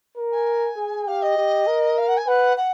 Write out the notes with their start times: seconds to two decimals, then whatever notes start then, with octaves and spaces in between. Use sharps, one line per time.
0.17 A#4
0.31 G#5
0.77 G#4
1.07 G4 F5
1.22 D#5
1.37 G4
1.67 A#4
1.97 F5
2.07 F#5
2.17 G#5
2.27 B4 F#5
2.56 F#5